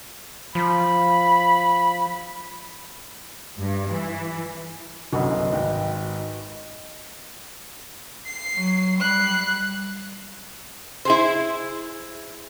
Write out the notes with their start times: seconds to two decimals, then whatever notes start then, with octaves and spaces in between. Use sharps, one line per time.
0.55 F3 B5
3.59 G2
3.89 E3
5.13 G1 C2 F#2 F#4 B4 D#5
5.52 G#1 G5
8.26 C7
8.55 F#3
8.99 G3 F#6 C7
11.05 E4 G#4 C5